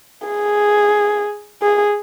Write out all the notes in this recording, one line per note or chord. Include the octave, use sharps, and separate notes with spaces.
G#4
G#4